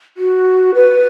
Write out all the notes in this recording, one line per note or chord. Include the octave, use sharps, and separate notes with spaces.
F#4
B4